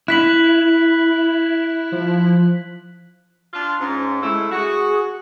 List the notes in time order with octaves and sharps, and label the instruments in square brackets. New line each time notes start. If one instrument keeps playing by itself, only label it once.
[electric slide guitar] E4 [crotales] F#6 B6 F#7
[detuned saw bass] F3
[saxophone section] D4 F4
[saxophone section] G#2 [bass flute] C#4
[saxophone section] C#3 A3 E4 [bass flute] G#3
[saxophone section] F#4 [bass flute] G#4